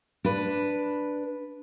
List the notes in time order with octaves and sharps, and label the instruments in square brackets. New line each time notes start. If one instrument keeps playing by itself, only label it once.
[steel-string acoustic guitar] D4 B4